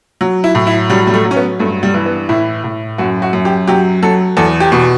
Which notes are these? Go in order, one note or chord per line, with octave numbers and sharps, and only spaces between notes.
F#3
E4
A2
E4
F#3 G3
G3
A3
F#3
C#4
B3
G2 A3
G3
E3
B3
A2 E4
A2
F#2 F#4
F#4
F#2
G4
F#3 G4
F#3 A4
E2 A4
G4
B2